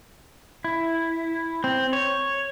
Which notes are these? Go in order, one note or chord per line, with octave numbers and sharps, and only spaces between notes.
E4
C4
C#5